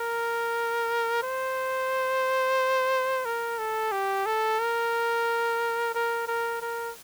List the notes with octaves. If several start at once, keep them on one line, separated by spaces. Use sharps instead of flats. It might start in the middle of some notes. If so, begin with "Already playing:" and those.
Already playing: A#4
C5
A#4
A4
G4
A4
A#4
A#4
A#4
A#4